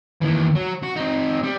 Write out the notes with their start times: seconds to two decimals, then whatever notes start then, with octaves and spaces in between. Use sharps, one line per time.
0.22 D#2 E3
0.55 F#3
0.83 F#4
0.96 C4 D#4
1.43 G3